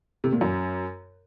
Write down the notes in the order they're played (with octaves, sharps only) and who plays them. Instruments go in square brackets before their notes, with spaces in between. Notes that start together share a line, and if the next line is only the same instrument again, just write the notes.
[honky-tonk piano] C3
A#2
F#2